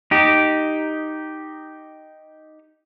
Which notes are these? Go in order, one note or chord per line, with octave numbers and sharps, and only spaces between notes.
D#4 G4